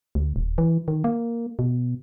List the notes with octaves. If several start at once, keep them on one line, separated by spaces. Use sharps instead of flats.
D2
D#1
E3
D#3
A#3
B2